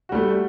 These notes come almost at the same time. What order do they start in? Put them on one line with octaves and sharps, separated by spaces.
F#4 G3 A3